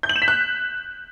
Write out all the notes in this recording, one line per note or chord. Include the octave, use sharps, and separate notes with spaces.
G6
F#7
E7
B6
F#6